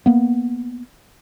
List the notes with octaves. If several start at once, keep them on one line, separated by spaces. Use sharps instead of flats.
A#3 B3